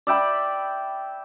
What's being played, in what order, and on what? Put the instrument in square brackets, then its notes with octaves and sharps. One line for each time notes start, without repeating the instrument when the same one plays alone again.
[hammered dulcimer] D5 E5 G5 B5